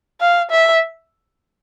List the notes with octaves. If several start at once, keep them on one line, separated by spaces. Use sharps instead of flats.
F5
E5